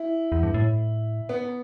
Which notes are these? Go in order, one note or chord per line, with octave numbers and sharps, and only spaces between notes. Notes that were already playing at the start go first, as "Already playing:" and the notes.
Already playing: E4
E2
G2
A2
B3